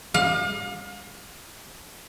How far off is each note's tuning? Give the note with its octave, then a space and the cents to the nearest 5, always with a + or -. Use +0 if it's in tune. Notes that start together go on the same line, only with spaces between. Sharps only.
F5 +40